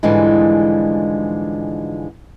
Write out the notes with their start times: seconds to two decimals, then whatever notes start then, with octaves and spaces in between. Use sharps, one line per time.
0.03 G#2 D3 E3 F3 G3 G#3